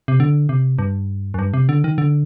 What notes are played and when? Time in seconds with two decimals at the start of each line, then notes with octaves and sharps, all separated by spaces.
0.08 C3
0.20 D3
0.49 C3
0.79 G2
1.34 F#2
1.39 G2
1.54 C3
1.69 D3
1.84 D#3
1.98 D3